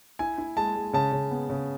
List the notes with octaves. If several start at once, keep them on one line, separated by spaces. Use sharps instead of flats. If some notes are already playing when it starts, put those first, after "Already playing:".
E4 G#5
E4
G#3 A5
G#3
C#3 A5
C#3
B3
C#3